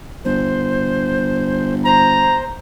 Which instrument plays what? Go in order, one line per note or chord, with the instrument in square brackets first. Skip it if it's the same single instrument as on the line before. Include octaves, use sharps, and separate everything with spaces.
[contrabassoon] G1 [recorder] C5
[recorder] C5 [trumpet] A#5